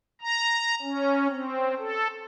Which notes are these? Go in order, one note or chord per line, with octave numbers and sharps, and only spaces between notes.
A#5
C#4
C4
A4